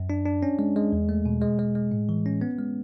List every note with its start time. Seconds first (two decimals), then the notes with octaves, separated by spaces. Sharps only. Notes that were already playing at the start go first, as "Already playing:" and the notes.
Already playing: F#2
0.10 D4
0.26 D4
0.43 C#4
0.59 G#3
0.76 G#3
0.92 E2
1.09 A3
1.26 B2
1.42 G#3
1.59 G#3
1.75 G#3
1.92 A2
2.09 E3
2.26 C#4
2.41 B3
2.59 G#3